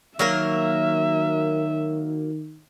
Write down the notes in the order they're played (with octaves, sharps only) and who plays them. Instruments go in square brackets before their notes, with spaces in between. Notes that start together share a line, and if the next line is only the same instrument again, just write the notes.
[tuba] D#3 [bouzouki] F#3 A#3 A#4 [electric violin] E5